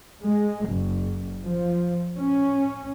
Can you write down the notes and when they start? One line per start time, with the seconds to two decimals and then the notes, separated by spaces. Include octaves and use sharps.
0.23 G#3
0.69 F#1
1.44 F3
2.17 C#4